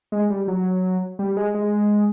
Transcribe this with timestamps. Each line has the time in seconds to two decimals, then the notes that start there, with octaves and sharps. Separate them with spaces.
0.12 G#3
0.30 G3
0.48 F#3
1.19 G3
1.37 G#3
1.55 G#3